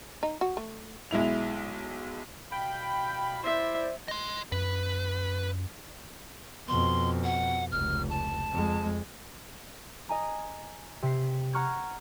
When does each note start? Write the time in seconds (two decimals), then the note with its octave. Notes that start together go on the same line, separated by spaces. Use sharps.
0.23 D#4
0.41 F#4
0.57 A3
1.11 B1 G#3 E4 F7
2.52 B2 F5 G5 B5
3.44 E4 C5 D5 E5
4.08 D#5 C6
4.52 F#2 B4
6.68 F2 B2 C6
7.25 F#5
7.72 F1 C#2 F6
8.10 A5
8.52 F2 G#3
10.09 D#5 G#5 A#5
11.02 C3 B6 C7
11.53 F#5 A#5 C#6 F6 F#6 G#6